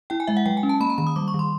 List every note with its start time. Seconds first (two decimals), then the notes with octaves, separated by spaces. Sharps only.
0.10 E4 G5
0.20 G#5
0.27 G#3 E5
0.37 F#5
0.46 F#3 G5
0.57 G#5
0.63 C#4
0.69 A5
0.80 A#3 B5
0.90 A#5
0.98 D#3 B5
1.07 D#6
1.16 G3 D6
1.28 C#6
1.34 D#3
1.39 C6